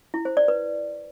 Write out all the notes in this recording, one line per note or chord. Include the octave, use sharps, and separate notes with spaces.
E4
C5
D5
B4